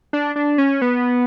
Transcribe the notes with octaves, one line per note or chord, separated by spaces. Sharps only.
D4
D4
C#4
B3